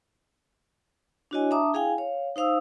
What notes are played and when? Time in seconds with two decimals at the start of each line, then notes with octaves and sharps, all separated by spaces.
1.31 D4 E4 F#4 C#5 D#5 G#5
1.51 D4 E5 A5 A#5 D6 D#6
1.73 E4 G#4 F5 G5 G#5
1.98 C#5 F5
2.36 D#4 C5 F5 D#6 E6